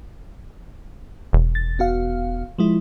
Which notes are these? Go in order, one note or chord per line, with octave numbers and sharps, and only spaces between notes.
E1
A6
B3 F#4 F5
F3 G#3 E4